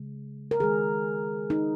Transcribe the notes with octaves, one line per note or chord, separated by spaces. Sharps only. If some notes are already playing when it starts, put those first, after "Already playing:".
Already playing: C#3 G#3
A#4
D#3 G#3 G#4
D#4